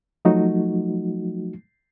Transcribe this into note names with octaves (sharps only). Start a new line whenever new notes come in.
F3 F#3 A3 D#4 F#4